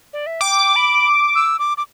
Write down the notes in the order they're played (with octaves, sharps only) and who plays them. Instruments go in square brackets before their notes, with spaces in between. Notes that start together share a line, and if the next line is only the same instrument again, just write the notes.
[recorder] D5
E5
[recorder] G5 [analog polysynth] D6
[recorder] B5
E6
D6
D6